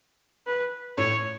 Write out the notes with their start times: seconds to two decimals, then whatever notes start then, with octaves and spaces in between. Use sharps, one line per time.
0.47 B4
0.98 A2 C#5